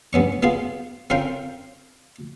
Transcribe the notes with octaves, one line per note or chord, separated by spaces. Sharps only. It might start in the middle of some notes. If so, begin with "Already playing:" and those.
G2 B3 C#4 C#6
B3 F4 G#4 F5
C4 C#4 F4 A#4 F5 G5